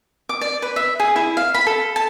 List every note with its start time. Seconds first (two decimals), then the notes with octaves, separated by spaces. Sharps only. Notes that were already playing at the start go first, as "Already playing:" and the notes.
0.29 D6
0.41 D5
0.62 B4
0.76 E5
1.00 G#4
1.16 E4
1.37 F5
1.54 B5
1.67 A4
1.96 A5